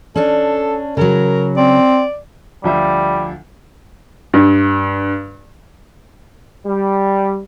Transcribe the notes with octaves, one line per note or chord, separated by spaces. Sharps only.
C#4 D4 A4
C#3 F#3 A#4
C4 D5
D2 F3 G3 E5
G2
G3